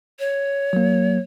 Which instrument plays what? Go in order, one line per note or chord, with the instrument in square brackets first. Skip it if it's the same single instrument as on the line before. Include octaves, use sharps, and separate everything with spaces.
[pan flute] C#5
[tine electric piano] F#3 A#3